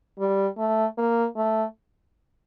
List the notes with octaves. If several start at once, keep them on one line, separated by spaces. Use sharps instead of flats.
G3
A3
A#3
A3